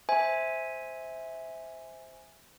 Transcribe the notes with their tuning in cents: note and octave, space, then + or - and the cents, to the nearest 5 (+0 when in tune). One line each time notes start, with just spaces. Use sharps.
C5 +0 E5 -15 G#5 +0